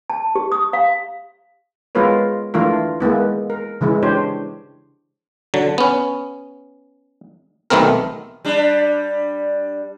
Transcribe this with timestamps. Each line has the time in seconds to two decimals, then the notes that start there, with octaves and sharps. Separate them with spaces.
0.10 A5
0.35 G4
0.52 D#6
0.73 F5
1.95 G#3 B3 F4 A#4 B4 C#5
2.54 E3 A3 D4 F4 A#4
3.00 G#3 A#3 B3 E4
3.50 A#4
3.81 C#3 E3 G#3 E4
4.03 D4 G4 C5 C#5
5.54 D3 F#3
5.78 B3 C#4
7.70 B1 D#3 A3 B3 C4 A#4
8.45 G3 D4